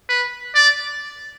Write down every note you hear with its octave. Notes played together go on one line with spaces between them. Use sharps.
B4
D5